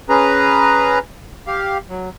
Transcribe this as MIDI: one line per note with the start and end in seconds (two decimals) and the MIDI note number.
0.09 0.99 61
0.09 0.99 68
0.09 0.99 71
0.09 0.99 82
1.47 1.78 67
1.47 1.78 77
1.89 2.10 54